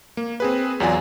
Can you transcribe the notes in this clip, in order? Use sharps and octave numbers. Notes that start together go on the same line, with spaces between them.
A#3
C4 G#4 B4
E2 F#3 F4 D5 G#5